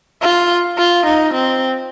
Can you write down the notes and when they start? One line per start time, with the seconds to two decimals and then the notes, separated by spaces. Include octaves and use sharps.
0.22 F4
0.78 F4
1.06 D#4
1.34 C4